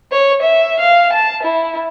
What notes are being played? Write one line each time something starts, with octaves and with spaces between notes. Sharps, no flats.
C#5
E5
F5
A5
E4